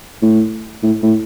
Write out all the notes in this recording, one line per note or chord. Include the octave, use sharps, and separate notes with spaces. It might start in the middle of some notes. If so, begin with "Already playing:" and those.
A2
A2
A2